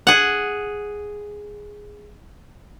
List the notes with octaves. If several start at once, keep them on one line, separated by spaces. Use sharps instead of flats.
G#4 F#5